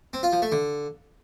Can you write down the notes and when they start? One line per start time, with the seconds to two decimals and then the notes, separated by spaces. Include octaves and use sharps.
0.13 C4
0.23 F4
0.33 F3
0.42 A3
0.52 D3